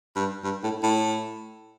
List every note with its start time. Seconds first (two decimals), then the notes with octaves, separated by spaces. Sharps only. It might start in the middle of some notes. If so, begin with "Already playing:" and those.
0.16 G2
0.44 G2
0.63 A2
0.83 A2